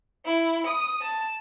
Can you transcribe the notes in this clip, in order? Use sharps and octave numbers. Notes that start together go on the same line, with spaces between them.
E4
D#6
A5